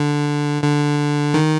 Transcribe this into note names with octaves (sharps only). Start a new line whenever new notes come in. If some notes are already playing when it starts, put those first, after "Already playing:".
Already playing: D3
D3
D#3